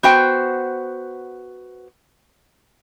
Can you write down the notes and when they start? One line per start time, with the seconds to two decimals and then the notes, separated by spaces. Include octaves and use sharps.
0.03 B3 F#4 C5 G5